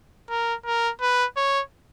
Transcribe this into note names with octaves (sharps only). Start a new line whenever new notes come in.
A#4
A#4
B4
C#5